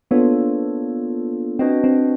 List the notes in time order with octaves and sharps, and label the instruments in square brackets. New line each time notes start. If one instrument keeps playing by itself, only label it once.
[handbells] A#3 D4 F4 A4 C#5 [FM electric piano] B3
[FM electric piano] C4 [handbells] D4 F#4 B4 D#5 G5
[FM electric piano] C4